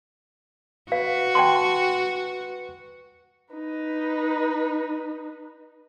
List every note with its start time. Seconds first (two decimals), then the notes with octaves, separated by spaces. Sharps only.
0.92 F#4 B4 F5
1.35 G5 A5 C6
3.54 D#4 B4